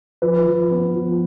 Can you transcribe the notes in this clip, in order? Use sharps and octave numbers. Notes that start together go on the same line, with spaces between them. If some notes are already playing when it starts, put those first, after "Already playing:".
F3 B4
F3
B3
F3